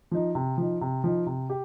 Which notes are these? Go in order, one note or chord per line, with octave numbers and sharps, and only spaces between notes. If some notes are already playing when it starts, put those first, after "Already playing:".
F3 D#4
C3
F3 D#4
C3
F3 D#4
C3
G4